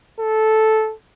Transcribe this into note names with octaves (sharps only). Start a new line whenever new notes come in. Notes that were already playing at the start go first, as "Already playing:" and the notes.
A4